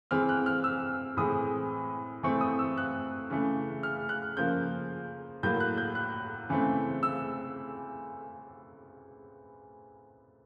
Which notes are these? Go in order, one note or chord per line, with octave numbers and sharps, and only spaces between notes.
E3 G#3 C4 F6
F#6
F6
E6
A2 E3 G#3 C4 D#6
E3 A3 C4 C#6
D#6
E6
F#6
C#3 E3 A3
F6
F#6
C#3 F3 A#3 G6
A2 F#3 A#3 G6
F#6
G6
F#6
C#3 E3 A3 C4
E6